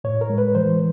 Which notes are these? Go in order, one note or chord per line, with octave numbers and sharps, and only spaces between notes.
A2 C#5
A#4
G#3
B4
E3 C5